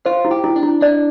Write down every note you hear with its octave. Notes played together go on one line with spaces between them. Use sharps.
F4 C5
E4
G4
E4
D4
E4
D4 D5